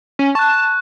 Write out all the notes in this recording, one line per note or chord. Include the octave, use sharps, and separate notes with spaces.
C#4
A5 C#6 F#6